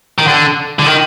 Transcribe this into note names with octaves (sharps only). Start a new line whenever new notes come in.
D#3
D3
D3
D#3